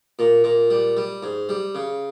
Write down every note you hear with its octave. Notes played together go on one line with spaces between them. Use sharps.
A#2
A#2
G3
G3
G#2
G3
C#3